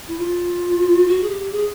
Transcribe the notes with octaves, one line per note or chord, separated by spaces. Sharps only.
E4
F4
F#4
G#4
G4
G#4